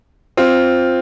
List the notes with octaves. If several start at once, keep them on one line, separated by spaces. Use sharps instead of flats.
C4 F4